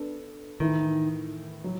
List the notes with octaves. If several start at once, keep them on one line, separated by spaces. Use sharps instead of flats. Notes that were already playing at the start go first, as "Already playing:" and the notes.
Already playing: B3 D4 A4
A2 D#3 E3 A3
F#3